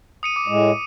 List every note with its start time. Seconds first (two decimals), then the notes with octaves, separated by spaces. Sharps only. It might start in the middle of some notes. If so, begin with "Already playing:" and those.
0.23 D#6 C#7 D#7
0.36 D6
0.48 A2 G#3